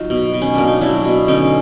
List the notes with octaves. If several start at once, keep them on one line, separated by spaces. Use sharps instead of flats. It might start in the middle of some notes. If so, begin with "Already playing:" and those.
Already playing: F#3 D#4 F4
B2
B2
C#4
A#3 D4
D#4
F#3 D4 E4
B2
D3 C#4 D#4